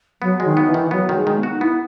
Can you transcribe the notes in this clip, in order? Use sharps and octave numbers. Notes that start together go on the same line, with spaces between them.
F#3 B3
D#3 G#3
B3
E3
D#3
F#3 B3
D#3
G#3
D#3
B3
F#4
D#4
B3 E4